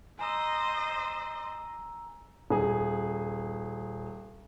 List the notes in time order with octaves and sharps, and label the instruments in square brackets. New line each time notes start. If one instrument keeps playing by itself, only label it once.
[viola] C5 D#5 [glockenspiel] G#5 A#5 E6
[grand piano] D#1 G#4